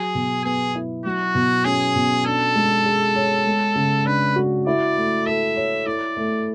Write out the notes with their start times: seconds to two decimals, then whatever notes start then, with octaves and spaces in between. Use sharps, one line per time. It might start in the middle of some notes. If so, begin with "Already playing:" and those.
Already playing: F#3 G#4
0.15 B2
0.44 B3 G#4
0.75 E4
1.05 F#3 F#4
1.35 B2
1.65 C#4 G#4
1.96 B2
2.26 D4 A4
2.55 G#3
2.86 G#4
3.16 C#5
3.46 G#3
3.75 C#3
4.06 D4 B4
4.36 F#4
4.67 E4 D5
4.96 A3
5.26 A4 E5
5.56 C#5
5.86 E4 D5
6.17 A3